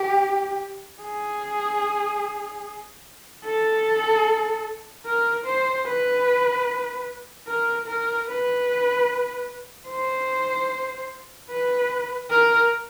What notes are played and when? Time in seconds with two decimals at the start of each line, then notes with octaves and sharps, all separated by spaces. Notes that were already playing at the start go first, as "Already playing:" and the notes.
Already playing: G4
1.02 G#4
3.44 A4
5.06 A#4
5.45 C5
5.86 B4
7.47 A#4
7.87 A#4
8.28 B4
9.89 C5
11.50 B4
12.30 A#4